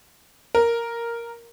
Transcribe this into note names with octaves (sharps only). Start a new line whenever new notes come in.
A#4